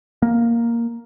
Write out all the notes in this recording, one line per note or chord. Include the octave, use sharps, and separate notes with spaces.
A#3